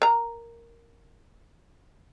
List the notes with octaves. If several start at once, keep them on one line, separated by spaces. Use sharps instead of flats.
A#4 A#5